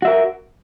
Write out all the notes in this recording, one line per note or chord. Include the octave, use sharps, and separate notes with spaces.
F#4 A#4 E5